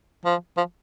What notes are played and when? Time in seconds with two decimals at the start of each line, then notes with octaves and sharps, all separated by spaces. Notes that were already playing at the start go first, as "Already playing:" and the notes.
0.25 F3
0.57 F3